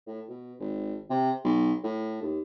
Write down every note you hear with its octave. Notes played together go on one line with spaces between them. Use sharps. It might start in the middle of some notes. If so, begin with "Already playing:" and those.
A2
B2
G#1
C3
B1
A2
D#2